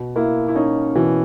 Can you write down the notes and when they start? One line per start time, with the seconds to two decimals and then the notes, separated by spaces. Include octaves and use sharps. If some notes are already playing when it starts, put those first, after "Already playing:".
Already playing: B2
0.16 A#3 E4
0.48 E4
0.55 C#4 D#4
0.95 B2 E3